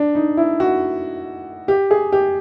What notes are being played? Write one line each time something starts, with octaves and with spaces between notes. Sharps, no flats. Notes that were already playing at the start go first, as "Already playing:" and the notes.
Already playing: D4
D#4
E4
F#4
G4
G#4
G4